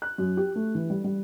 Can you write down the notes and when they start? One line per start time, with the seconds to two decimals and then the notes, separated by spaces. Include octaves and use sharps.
0.02 F#6
0.18 F#2
0.37 G4
0.55 A3
0.75 E3
0.90 G3
1.04 G3